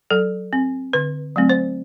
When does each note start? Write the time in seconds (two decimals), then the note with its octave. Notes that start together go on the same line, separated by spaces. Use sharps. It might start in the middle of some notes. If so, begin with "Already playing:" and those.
0.10 F#3 A4
0.53 C4
0.93 D3 B4
1.36 F#3 A3 C4
1.50 C5